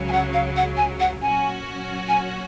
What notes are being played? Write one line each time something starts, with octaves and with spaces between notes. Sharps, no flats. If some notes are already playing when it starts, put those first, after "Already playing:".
Already playing: C#2 C#3 F#3
G#5
F#5
F5
F#5
G#5
F#5
A#2 F#3 C#4 F#4 G#5
G#5